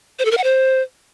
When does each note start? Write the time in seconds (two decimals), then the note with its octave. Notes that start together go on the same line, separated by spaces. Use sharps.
0.19 C5
0.25 A4
0.31 A#4
0.38 F#5
0.44 C5